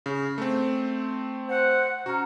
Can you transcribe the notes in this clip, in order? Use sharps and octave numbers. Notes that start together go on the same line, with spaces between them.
C#3
A3 C4
C5 F#5
B2 C#4 F#4 A#5